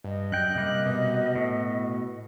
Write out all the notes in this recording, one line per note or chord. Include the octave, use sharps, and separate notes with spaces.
G2 D#5
F#2 G5 F#6
C3 G3 A#3
B2
A2